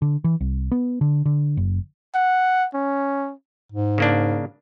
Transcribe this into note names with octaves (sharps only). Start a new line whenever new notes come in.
D3
E3
C2
B3
D3
D3
F#1
F#5
C#4
G#2
C#3 A#3 D4